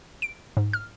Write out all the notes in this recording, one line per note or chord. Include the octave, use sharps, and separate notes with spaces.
D7
G#2
F6